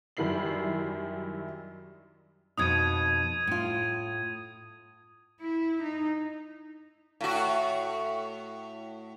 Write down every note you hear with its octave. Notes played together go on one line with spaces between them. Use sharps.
F#2 D#3 G3 E4 C7 F#7
F2 B2 D#4 D#6 G#6 D#7
A2 F4
E4
D#4
A2 F#4